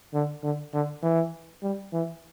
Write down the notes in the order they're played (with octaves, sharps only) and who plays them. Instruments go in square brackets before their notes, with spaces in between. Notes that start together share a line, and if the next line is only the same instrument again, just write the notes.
[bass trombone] D3
D3
D3
E3
G3
E3